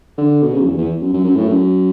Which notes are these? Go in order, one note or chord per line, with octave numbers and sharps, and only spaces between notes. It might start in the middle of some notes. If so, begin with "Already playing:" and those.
D3
B2
C#3
F#2
E2
E2
F#2
F#2
F#2
A2
F#2